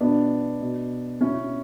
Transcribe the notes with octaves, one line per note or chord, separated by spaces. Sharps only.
B2 B3 D4
B2
B2 C#4 E4